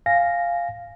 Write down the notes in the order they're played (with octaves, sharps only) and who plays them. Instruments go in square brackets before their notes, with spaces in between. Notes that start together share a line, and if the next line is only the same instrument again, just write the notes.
[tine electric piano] F5 G#5 A#6